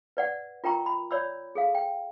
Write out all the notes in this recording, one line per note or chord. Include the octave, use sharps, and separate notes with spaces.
B4 D5 F#5
F4 A#4 G5 A#5 C#6
B5
C#5 D5 B5 E6
G#4 A4 F5
G5